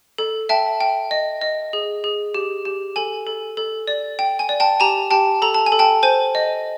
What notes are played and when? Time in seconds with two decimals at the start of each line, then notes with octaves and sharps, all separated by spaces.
0.18 A4
0.49 E5 G5 A5
0.80 G5
1.11 D#5
1.41 D#5
1.73 G#4
2.04 G#4
2.34 G4
2.65 G4
2.96 A4 G#5
3.27 A4
3.57 A4
3.87 D5
4.19 G5
4.39 G#5
4.49 D5
4.60 G5 A5
4.80 G4 G#5 A#5
5.11 G4 G5 A5
5.42 A4 A#5
5.54 A5
5.66 G#5
5.72 A4
5.79 G5 A5
6.03 C5 G#5
6.35 D#5